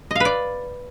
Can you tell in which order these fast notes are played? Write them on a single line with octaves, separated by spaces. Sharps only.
D#5 F5 B4 D5